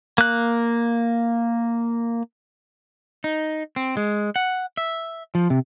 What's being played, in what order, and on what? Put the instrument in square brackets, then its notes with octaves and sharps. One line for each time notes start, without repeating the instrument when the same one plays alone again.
[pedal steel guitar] A#3 F#6
[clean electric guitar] D#4
C4
G#3
F#5
E5
F3
C3